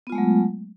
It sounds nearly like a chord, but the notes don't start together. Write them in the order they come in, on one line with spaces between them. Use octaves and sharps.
B3 F4 G#3 A3 F#3